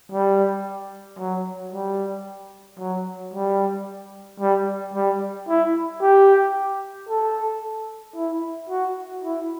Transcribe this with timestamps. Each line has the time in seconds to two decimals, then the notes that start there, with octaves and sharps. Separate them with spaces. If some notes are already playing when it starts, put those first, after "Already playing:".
0.12 G3
1.19 F#3
1.72 G3
2.79 F#3
3.34 G3
4.40 G3
4.94 G3
5.48 E4
6.01 G4
7.09 A4
8.16 E4
8.69 F#4
9.24 E4